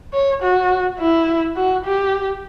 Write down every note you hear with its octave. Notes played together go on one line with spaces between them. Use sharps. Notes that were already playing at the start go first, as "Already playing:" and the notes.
C#5
F#4
E4
F#4
G4